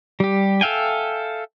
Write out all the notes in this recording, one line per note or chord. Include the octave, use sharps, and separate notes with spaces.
G3 G4
A4 E5 F5 G5 G#5